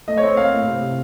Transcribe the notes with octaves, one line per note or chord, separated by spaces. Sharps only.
A3 D#5
C#5
C4
A#3 F5
A2
C3
C3